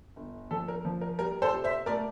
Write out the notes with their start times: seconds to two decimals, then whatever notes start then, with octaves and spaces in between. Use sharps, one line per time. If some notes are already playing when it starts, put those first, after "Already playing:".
0.16 G1
0.51 F3 A4
0.68 A#4
0.85 F3
1.01 A#4
1.18 G3 A#4
1.42 A4 C5
1.53 C3
1.64 C5 E5
1.86 A3 A#4 D5